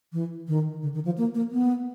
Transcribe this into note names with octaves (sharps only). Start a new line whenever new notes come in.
E3
D#3
D3
D#3
F3
A#3
A#3
B3